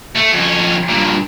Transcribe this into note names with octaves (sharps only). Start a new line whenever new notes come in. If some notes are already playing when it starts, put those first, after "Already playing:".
A3
F2 C#4
G2 A#2